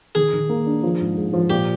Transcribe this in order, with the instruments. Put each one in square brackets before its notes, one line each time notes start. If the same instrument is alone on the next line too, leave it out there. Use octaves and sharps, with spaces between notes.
[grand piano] D#3 [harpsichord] G#4
[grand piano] D#3
A#3
D4
F3
G#2
G#2
F3
[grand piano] A#2 [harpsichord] G4